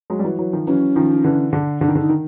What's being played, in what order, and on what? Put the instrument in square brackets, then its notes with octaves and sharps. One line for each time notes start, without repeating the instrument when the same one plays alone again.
[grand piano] F#3 G#3
G3
E3 F#3
E3 F#3
D#3 F3
[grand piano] E3 F#3 [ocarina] C#4
[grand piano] D#3 F3
D3 E3
D3
[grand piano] D3 [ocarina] D4
[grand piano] D#3
D3
[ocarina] D#4
[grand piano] D#3